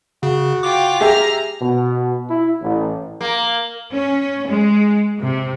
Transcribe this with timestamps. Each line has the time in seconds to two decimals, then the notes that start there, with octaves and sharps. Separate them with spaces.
0.23 C#3 F#4
0.63 F4 G5 D6
1.01 G4 G#4 E5 A#5 F6
1.62 B2
2.29 E4
2.62 A1
3.21 A#3
3.93 C#4
4.48 G#3
5.20 C3